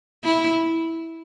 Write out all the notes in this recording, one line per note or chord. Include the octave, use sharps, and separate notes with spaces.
E4